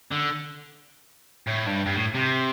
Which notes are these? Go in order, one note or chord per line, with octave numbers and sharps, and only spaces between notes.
D3
A2
G2
G2
A2
C3